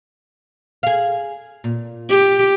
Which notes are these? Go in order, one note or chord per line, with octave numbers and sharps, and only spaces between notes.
G#4 F5
A#2
G4